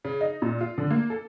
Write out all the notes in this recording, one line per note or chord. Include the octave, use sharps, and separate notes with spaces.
C#3
D#4
A#2
F4
D3
A#3
A4